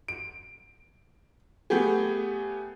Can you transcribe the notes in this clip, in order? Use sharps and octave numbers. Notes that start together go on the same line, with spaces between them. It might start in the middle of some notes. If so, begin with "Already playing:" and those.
D7
A3 B3 G4 G#4